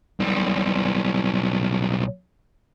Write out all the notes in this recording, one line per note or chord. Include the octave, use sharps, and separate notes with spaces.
B1 G3